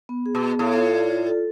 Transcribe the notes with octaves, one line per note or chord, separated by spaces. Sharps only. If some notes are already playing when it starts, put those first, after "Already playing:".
B3
G#4
B2
B3
A2 F5
F4
D5
F4
A4